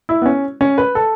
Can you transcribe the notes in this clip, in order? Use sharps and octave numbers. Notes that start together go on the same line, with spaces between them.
E4
B3
C#4
C#4
B4
A4